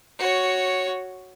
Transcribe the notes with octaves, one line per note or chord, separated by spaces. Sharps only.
F#4 C#5